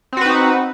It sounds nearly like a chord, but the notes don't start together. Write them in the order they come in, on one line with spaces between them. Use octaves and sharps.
C4 F#4 B4 D#4